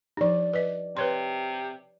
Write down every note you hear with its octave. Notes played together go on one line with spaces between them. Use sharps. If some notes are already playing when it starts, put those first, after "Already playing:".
F3 D#4 G4 D5
B4 D#5
C3 B4 C#5 C6